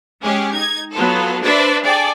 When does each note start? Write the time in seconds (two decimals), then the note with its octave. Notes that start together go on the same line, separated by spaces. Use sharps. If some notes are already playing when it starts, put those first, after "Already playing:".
0.23 G#3 C#4 G4 G#4
0.53 D#4 G#6
0.93 F#3 B3 F4 A4
1.42 D4 B4 C5 D5 E5
1.84 G#4 A4 D5 G5